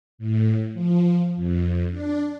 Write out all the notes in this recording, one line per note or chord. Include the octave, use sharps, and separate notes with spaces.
A2
F3
F2
D4